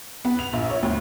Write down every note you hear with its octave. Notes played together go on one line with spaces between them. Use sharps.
B3
F7
A#1
C#5
D2